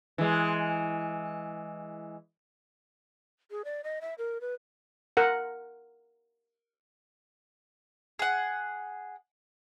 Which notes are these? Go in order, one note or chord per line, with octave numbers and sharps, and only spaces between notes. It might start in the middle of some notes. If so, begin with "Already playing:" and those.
E3 G#3
G#4
D5
D#5
E5
A#4
B4
A#4 F#5
G#4 F#5